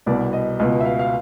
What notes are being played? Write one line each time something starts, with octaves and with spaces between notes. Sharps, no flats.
C2 B2 D5
D#5
C#2 B2 D#5
E5
F5
F5